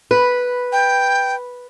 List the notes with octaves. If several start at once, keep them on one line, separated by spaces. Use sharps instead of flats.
B4
G5